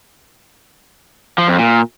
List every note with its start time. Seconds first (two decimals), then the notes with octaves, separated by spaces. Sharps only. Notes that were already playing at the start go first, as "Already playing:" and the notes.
1.38 F3
1.48 F2
1.59 A#2